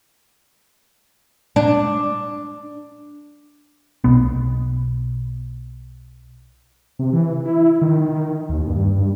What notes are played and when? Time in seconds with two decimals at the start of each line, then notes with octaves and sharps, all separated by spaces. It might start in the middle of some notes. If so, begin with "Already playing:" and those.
1.56 D4
4.04 B1 B2 B3
6.99 C3
7.13 E3
7.45 E4
7.81 D#3
8.00 D#3
8.49 D#2
8.67 G2
8.98 G2